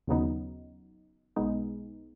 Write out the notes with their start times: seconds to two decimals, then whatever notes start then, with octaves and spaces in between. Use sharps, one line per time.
0.07 D#2 C#3 F#3 B3 D#4
1.36 B1 B2 G#3 B3 D#4